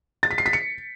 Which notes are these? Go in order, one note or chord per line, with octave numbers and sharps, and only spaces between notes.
A6
B6
C7
B6
C#7